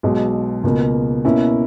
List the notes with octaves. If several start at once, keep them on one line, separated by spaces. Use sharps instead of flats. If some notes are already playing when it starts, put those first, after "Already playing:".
B1 B2 G#3
C#2 B2 A#3
B2 A#3 C#4 E4